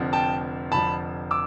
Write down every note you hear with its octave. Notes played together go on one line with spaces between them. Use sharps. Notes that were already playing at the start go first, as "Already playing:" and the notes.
Already playing: F1 F2 D3 F3
G5 A5
F1 F2 D3 F3 A5 B5
D6 E6